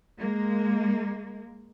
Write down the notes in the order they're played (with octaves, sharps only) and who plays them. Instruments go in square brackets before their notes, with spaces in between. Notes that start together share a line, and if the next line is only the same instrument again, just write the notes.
[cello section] G#3 A#3